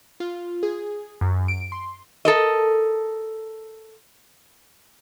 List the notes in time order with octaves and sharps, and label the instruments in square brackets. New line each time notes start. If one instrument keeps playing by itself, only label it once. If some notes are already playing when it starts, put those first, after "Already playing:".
[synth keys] F4
G#4
F#2
D7
C6
[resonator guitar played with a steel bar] A4 A#4 D#5